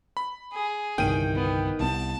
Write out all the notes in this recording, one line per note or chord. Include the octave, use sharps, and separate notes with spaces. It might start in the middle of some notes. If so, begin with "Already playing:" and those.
B5
G#4
G1 C2 D#3 G5 D#7
B3
C2 B3 A5